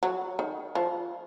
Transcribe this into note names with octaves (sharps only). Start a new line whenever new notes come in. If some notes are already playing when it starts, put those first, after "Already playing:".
F#3
D#3
F3